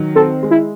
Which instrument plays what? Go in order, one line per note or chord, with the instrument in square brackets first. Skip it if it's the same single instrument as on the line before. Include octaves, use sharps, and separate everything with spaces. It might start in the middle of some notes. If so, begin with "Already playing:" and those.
Already playing: [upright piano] D#3 F#3
[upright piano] C4 [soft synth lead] A4
[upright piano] G#3
[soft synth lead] E4